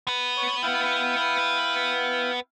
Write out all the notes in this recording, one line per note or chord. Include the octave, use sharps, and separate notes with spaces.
B3 B4
C#5
E4 F5 G5